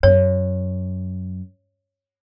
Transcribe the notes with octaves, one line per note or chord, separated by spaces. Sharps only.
F#2 C#5